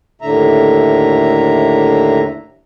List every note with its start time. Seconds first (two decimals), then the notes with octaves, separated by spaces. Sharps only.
0.22 D#2 A2 D3 E5 A#5